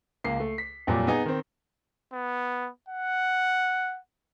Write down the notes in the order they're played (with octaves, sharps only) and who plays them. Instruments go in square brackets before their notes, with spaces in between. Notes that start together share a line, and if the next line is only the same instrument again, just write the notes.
[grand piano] C#2 A#3 C7
A3
B6
F2 A#2 F#3 G3
B3 D#4 G#4
D#3 C4
[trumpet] B3
F#5